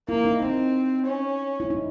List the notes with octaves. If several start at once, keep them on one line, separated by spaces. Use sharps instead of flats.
A#3 E4
D#4
C4 D#4
C#4
E4
D#4